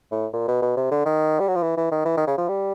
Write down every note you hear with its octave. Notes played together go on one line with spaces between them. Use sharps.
A2
A#2
B2
B2
C3
D3
D#3
G3
F#3
F3
E3
E3
D#3
E3
D#3
C#3
F3
G3